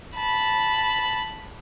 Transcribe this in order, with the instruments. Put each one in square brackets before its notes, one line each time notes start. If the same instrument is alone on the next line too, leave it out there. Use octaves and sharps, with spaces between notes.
[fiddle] A5 B5